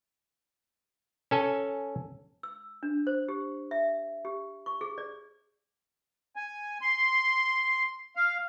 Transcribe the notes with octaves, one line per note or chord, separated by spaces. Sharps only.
C#4 A4 G#5
E6
D4
C5
G4
E5
G4
C#6
G#4
D5
G#5
C6
F5